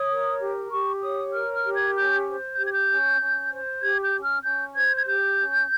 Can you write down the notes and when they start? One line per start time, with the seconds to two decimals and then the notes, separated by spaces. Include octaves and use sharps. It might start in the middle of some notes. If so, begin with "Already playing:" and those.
Already playing: C#5 D#6
0.10 A#4
0.40 G4
0.71 G4 C#6
1.02 C#5 D#6
1.33 A#4 F6
1.54 F6
1.64 G4
1.75 G#6
1.95 C#4 G6
2.27 C5
2.57 G4 G6
2.66 G#6
2.73 G6
2.88 C#4
3.20 C#4
3.50 C5
3.81 G4 G#6
4.02 G6
4.13 C#4
4.23 F6
4.43 C#4 G6
4.74 C5 G#6
4.95 G#6
5.05 G4 G6
5.37 C#4